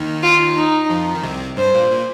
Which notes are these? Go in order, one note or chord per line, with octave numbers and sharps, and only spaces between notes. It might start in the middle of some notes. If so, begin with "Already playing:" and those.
Already playing: D#2 D#3
F4
D#4
F2 F3
D#3
C2 C3
G2 C5
A#2
A#2